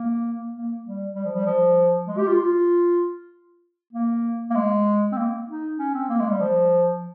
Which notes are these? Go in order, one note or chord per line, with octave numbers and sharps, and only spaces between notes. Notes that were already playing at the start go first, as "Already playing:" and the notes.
Already playing: A#3
A#3
G3
G3
F3
G3
F3
G#3
G4
F4
F4
A#3
A#3
G#3
C4
A#3
D#4
C#4
C4
A#3
G#3
G3
F3